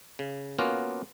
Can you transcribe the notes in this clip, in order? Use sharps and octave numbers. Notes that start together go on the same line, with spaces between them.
C#3
A#3 B3 C#4 F4 F#4 A#4